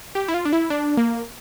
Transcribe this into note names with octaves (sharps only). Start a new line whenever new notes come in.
G4
E4
F4
D4
E4
D4
A#3